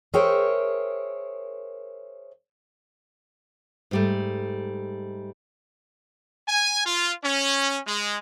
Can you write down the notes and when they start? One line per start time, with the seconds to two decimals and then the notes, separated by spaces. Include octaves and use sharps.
0.14 G#4 A#4 C5 C#5 E5 G5
3.91 G#2 G3 A3
6.48 G#5
6.86 F4
7.24 C#4
7.87 G#3